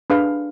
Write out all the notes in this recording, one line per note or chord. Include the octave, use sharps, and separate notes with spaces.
D4 G#4 B4 F5